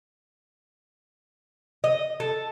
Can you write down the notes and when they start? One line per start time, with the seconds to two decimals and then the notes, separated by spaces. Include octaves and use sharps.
1.84 D#5
2.20 A4